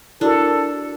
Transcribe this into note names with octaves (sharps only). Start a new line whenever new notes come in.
D4 E4 F#4 A4 A#4